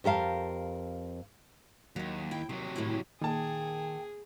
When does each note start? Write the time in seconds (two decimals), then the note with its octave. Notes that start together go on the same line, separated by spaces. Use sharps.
0.04 F2 G4 A#4 F5 A5
1.96 D#2 D#3 F#3
2.31 E4 G5
2.49 D#2 C3 F#3
2.76 A2 D#3 E4
3.21 A#2 D#3 G#4 G5 A5